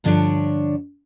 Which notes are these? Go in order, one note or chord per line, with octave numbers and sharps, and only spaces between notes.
G2 D3 F3 G#3 D4 C#5